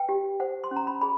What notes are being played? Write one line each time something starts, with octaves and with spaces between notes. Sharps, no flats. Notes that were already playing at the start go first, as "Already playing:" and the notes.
Already playing: B4 G5
G4
C5 F#5
C6
C#4
A#5
B5
G#4 B5